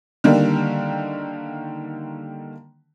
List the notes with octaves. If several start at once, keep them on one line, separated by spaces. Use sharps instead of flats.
D3 D#3 G3 A#3